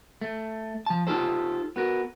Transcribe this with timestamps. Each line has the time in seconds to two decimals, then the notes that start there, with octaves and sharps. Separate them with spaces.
0.21 A3
0.86 F3 A5
1.07 D#4 F4 G4 A4 C5
1.76 B3 F#4 A#4